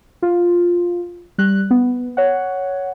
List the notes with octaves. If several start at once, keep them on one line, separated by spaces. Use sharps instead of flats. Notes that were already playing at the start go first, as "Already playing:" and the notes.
F4
G3 F#6
B3
C#5 F#5